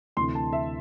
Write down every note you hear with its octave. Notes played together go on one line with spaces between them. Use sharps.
D2 C3 E3 C6
A5
E5